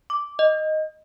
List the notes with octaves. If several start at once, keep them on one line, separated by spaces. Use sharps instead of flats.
D6
D#5